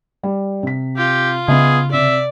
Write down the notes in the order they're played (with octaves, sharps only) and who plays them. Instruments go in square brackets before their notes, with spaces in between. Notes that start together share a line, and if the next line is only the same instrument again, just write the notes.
[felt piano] G3
C3 B6
[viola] F4 [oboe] G4
[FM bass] C#3 [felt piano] B3 D#5 E5 [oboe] G#4
[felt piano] C3 [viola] D5 [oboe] E5